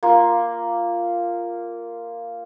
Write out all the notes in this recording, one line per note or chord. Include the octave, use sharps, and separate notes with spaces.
A#3 F4